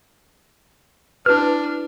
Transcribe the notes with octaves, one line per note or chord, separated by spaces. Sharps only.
D4 E4 F#4 B4 F6